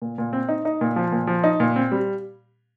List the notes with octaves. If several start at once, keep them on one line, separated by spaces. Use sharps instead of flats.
A#2
A#2
C4
D#4
D#4
A#2
F3
A#2
F3
D#4
A#2
C4
G3